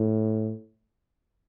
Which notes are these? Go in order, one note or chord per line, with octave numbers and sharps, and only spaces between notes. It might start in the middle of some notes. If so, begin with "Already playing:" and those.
Already playing: A2